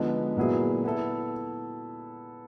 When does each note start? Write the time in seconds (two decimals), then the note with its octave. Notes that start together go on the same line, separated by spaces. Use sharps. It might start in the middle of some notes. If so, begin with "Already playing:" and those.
Already playing: D3 F3 G#3 B3 D#4
0.37 A#2 F#3 B3 E4 G#4
0.84 B3 E4 A4